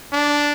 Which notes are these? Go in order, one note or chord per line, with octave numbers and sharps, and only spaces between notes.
D4